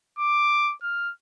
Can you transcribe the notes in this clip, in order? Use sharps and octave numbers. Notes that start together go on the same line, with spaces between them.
D6
F6